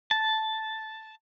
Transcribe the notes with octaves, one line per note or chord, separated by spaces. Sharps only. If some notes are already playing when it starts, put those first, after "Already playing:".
A5